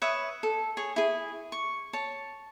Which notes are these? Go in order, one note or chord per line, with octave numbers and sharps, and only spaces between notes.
B4 C#5 E5 D#6
A4
G#4 C#5
E4 G#4
C#6
C#5 A5